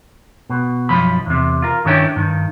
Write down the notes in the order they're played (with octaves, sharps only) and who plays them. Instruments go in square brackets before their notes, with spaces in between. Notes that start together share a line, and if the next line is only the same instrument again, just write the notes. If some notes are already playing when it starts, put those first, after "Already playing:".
[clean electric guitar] B2
B1 F#2 F3 B5
E2 C3
F4 A#4
G2 D#3 C#4 D4 E4 G5
G2 D#3